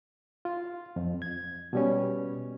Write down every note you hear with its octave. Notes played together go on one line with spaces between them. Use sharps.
F4
F2
G#6
B2 G3 C#4